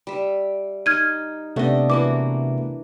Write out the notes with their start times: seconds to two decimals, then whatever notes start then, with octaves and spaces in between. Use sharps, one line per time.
0.07 G3 E5
0.86 D#4 F6 G#6 D#7
1.56 C3 A3 B3 D4 D#5
1.90 E3 A#3 F#4 D6